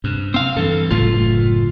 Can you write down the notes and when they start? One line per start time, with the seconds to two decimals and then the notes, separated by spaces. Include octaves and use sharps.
0.04 G2 C3
0.34 C4 F5
0.57 G2 E3 A4
0.91 F#1 A2 A3 F4